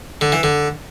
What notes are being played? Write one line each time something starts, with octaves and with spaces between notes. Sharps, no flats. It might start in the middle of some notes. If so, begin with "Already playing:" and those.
D3
E3
D3